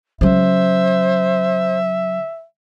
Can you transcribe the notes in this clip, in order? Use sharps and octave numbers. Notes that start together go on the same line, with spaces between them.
C#3 F#3 C5 E5